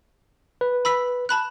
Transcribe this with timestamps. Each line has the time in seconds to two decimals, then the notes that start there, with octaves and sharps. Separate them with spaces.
0.61 B4
0.85 B5 E6 B6
1.29 A5 B5 F#6